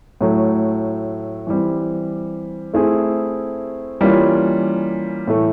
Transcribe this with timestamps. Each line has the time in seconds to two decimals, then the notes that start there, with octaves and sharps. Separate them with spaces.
0.21 A2 F#3 A3
1.47 E3 G3 C4
2.74 A3 C4 E4 G#4
4.01 E3 G3 A#3 C#4 F4
5.27 A2 E3 A3